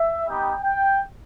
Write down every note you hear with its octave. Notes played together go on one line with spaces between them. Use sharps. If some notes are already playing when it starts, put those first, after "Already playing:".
Already playing: E5
G3 B3 D#4 G4 G5
G5